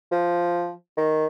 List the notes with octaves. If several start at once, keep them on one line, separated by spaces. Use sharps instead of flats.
F3
D#3